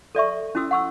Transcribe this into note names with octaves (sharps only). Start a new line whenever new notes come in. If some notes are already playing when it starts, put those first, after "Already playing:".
A4 D5 E5 C#6
C#4 E4 F#4 D#6 E6
F#5 C#6 E6